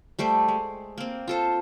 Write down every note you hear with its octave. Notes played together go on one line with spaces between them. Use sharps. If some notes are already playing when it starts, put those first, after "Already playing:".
G3 A3 C5 D5
G#3
A#3 C4
F4 A4 C5